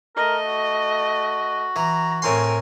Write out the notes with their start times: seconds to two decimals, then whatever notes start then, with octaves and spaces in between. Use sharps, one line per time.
0.16 A3 A#4 D#5
0.47 F#4
1.76 E3 A#5
2.22 A2 C4 A#4 G#5 C6